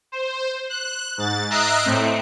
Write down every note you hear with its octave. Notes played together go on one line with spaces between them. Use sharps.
C5
F#6
G#2 A6
D#5 E5 A#5 F#6 C7 D7
A2 A3 C4